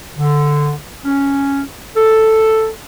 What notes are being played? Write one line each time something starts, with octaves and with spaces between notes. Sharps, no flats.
D3
C#4
A4